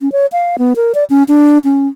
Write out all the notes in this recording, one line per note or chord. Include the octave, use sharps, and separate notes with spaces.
C#4
C#5
F5
B3
A#4
D5
C#4
D4
C#4